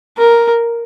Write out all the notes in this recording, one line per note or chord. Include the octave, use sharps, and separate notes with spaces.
A#4